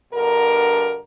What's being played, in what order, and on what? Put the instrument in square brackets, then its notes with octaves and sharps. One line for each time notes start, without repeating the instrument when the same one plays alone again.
[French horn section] G2 B2 D3 A#4